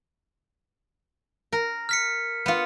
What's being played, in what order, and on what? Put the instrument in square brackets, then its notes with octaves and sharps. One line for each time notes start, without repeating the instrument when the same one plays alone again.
[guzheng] A#4
[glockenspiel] F6 B6 C#7
[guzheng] B3 F4